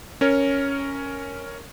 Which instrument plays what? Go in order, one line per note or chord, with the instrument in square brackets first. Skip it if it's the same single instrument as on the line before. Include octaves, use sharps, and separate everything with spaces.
[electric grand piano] C#4 A#4 C#5